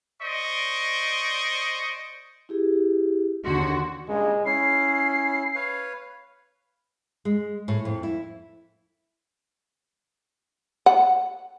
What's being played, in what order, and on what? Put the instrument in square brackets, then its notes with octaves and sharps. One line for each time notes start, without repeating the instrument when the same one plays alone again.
[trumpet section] C5 D5 D#5 C#6
[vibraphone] E4 G4 G#4
[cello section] D#2 D3 F#4 [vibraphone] C6
[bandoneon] G2 A#2 C#3 [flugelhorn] G#3
[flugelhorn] C#4 [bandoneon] E4 [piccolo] C7
[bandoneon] B4 C#5 F5
[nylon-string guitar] G#3
A2
F2
E4
[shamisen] F#5